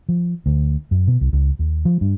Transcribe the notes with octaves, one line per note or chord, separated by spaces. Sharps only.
F3
D2
F#2
B2
C2
C#2
D#2
F3
G2